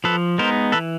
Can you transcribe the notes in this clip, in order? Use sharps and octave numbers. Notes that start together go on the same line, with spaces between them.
F3 A4 B4
G#3 B3 D#4 A#4 C5
E3 A4 B4